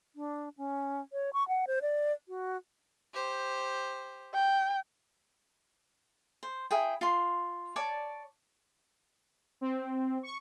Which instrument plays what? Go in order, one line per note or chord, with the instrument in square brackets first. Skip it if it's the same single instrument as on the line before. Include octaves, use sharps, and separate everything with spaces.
[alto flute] D4
C#4
C#5
C#6
F#5
C5
D5
F#4
[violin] G4 C5
[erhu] G5
[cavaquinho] C5
E4 G#4 G5
F4 C6
C#5 D5 A5 D6
[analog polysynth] C4
C#6